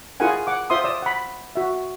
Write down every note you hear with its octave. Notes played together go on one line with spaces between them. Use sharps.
E4 F4 G#4 A#4 F#5 G#5
F#5 D6
F4 C5 E5 C6 D#6
D5 D#6 E6
F#5 B5
F#4 E5